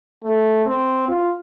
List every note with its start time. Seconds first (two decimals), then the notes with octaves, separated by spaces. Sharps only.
0.23 A3
0.66 C4
1.08 F4